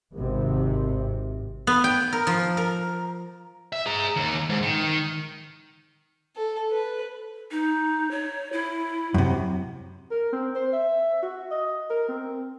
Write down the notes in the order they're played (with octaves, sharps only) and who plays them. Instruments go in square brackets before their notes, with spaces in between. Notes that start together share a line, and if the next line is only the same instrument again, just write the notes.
[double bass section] G#1 C3
[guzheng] B3
G5
A#4
F3
A#4
[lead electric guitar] E5
G#4 A#5
D#2
G#2
D#3
[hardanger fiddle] A4
B4
[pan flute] D#4
C#5
E4
[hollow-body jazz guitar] F#2 C3
[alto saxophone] A#4
C4
C5
E5
F#4
D#5
A#4
C4